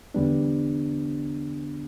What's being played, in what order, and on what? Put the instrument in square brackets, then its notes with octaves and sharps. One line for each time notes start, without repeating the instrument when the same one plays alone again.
[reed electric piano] E2 D3 G3 B3 D4